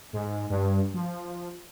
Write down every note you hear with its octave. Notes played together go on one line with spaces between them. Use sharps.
G#2
G2
F3